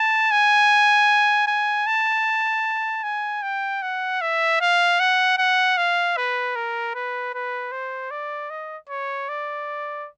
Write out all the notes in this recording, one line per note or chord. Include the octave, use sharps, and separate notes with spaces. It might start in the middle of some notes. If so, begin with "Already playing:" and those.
Already playing: A5
G#5
G#5
A5
G#5
G5
F#5
E5
F5
F#5
F#5
F5
B4
A#4
B4
B4
C5
D5
D#5
C#5
D5